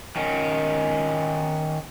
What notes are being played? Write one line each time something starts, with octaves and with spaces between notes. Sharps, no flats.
D#3 C#4